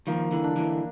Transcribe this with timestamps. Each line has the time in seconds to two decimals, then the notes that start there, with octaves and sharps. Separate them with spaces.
0.07 D#3 F3 A#3
0.31 D3 E3
0.44 D4
0.56 D3 E3